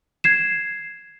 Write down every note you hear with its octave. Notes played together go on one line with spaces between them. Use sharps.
G#6 C7 E7